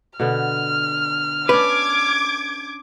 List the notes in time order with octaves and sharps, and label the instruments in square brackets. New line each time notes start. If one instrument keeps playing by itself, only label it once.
[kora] B2 D3 B3 [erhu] F6
[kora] C#4 D4 [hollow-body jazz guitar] B4 [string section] D6 G#6